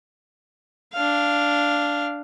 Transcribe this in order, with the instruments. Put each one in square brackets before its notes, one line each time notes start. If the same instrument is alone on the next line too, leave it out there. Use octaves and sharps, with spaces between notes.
[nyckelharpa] D4 F5